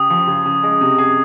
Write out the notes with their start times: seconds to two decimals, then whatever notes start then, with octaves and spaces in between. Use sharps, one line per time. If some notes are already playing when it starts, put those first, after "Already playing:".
Already playing: C#3 G4 D#6
0.10 F3
0.27 C#3
0.45 C#3
0.63 G#3
0.81 C3
0.98 G#4